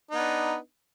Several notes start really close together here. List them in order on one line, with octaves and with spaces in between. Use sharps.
D#4 B3 D4